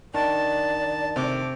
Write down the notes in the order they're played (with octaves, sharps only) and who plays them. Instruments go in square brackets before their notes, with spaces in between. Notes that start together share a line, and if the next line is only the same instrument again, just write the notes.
[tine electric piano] D#3 D4 [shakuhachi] D5 [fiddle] A5
[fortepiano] C3 [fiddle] A3 D6